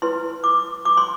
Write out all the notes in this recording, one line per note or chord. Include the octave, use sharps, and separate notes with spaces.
E4 B4 C6
D6
D6
C6